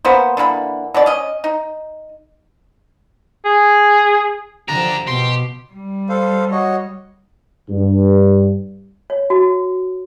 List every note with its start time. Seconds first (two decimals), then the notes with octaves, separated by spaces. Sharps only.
0.05 A#3 B3 C5
0.37 D3 E3 A#3 B5
0.94 B2 D3 D5
1.06 C#4 D#5
1.44 D#4
3.45 G#4
4.68 D3 F3 D4 G4 A#5
5.07 B2 G4 C6
5.71 G3
6.09 A4 C5 F5
6.52 F#4 C#5 D#5
7.70 G2
9.10 C#5
9.30 F#4